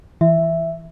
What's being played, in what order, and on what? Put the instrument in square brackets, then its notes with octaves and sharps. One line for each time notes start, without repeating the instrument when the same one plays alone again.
[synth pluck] E3 [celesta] E5